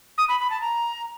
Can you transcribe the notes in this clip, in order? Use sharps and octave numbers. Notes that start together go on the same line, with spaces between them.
D#6
B5
B5
A5
A#5